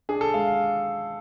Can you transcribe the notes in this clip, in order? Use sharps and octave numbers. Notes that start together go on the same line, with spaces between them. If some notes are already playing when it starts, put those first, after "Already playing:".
D4 G#4
A4
G#3 F5
F5